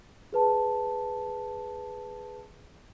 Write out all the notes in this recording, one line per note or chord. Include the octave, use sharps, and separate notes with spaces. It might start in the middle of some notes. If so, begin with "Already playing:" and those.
G#4 B4 A5